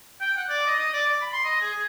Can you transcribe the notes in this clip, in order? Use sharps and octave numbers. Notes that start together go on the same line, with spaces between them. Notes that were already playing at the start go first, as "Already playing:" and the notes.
G5
F#5
D5
D#5
D#5
D5
D5
B5
C6
D#5
G#4
G#4